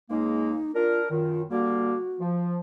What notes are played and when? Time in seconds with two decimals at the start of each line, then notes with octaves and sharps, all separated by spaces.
0.10 C#2 G#3 A#3 D#4
0.75 D4 F4 A#4
1.11 F#2 D#3 F4
1.51 D3 G3 A#3 F#4
2.20 F3